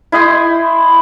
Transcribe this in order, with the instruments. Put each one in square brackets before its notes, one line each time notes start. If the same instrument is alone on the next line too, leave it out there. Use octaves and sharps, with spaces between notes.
[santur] E4 D#5 G5 C6